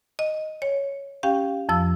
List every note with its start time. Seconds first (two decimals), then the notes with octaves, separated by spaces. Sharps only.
0.19 D#5
0.62 C#5
1.23 C#4 G4 F5 G5
1.69 F2 F3 E6